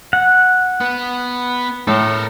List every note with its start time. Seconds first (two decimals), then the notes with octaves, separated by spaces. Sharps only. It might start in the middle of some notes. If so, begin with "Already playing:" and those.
0.13 F#5
0.80 B3
1.87 A2 A4 A#4